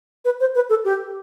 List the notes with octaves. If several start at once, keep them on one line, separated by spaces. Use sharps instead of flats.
B4
C5
B4
A4
G4